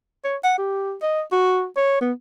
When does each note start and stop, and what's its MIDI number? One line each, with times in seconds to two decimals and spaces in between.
0.25 0.37 73
0.44 0.54 78
0.58 0.95 67
1.02 1.21 75
1.32 1.65 66
1.77 1.99 73
2.01 2.12 59